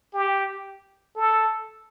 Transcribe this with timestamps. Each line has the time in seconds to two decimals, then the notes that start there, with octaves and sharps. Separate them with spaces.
0.14 G4
1.16 A4